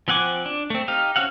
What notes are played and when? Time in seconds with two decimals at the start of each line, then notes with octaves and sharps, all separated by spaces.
0.08 F3 C4 F#5 G#5 D6
0.46 D4
0.70 A3 C4
0.88 D#4 G4 F5
1.16 C4 C#4 F#4 F5 F#5